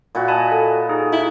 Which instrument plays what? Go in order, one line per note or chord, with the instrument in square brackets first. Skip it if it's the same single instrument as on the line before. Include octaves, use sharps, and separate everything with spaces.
[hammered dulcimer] A#2 E4 F#4
[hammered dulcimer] D#5 [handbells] G#5 A5 B5
[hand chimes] A4
[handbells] D#4 G#4
[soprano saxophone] E4